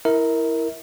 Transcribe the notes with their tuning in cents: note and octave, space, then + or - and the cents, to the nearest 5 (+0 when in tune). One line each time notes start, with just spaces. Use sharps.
E4 -5 A#4 +0 E5 -40